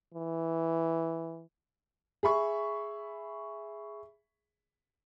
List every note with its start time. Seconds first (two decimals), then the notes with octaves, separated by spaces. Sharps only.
0.15 E3
2.23 G#4 E5 B5 C#6